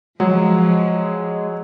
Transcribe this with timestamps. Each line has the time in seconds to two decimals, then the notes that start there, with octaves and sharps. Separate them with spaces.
0.20 F3 F#3 G#3